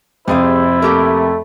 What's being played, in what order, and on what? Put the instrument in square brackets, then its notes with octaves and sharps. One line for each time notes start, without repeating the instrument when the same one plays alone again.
[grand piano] F2 C3 [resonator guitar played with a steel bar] G3 G#4 F5 [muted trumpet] E4 [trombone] C5
[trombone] A3 [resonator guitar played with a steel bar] A#3 G4 A#4